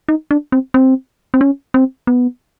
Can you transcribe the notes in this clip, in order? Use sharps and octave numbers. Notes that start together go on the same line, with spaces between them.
D#4
D4
C4
C4
C4
C#4
C4
B3